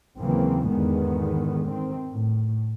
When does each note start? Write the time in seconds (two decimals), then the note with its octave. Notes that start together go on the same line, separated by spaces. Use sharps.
0.18 D#2 C#3 E3 F#3 A#3 C4
0.68 E2 G#2 D3 D#3 G#3 B3
1.66 D#3 C4
2.08 A2